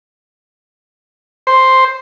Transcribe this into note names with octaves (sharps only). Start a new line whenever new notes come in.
C5